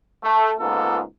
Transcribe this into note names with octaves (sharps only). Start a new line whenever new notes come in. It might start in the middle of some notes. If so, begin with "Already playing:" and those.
A3
C#2 G#2 A#3 B3 F4 A4